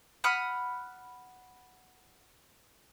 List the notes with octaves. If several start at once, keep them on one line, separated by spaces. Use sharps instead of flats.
F#5 B5 D#6 F6